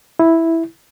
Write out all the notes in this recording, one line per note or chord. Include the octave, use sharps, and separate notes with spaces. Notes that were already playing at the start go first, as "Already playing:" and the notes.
E4